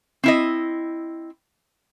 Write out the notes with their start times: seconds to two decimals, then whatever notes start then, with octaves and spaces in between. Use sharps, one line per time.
0.24 C4 E4 D#5